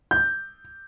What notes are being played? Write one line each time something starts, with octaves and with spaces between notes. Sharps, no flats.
G6